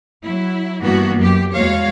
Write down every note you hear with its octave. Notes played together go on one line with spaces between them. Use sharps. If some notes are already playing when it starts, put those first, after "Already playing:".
F#3 E4
G2 E3 A#3 B3 F#4
F#2 G4
E2 G#3 F#4 C#5 F5